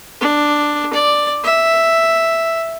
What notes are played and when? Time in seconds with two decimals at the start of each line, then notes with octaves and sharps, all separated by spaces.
0.21 D4
0.94 D5
1.44 E5